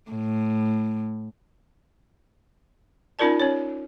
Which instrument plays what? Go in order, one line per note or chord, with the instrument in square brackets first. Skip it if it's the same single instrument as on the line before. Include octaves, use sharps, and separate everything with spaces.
[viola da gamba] A2
[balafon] C#4 D#4 F4 A#4 D5 A5
C#4 C#5